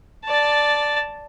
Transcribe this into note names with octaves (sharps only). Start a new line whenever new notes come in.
D5 A5